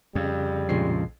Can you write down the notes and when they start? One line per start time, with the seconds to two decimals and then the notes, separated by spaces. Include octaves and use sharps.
0.15 F2 C#3 G3
0.69 A#1 C#3 F3 G#3 C7